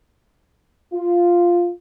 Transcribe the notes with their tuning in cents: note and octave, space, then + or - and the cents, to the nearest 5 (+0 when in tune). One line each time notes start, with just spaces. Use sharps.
F4 +0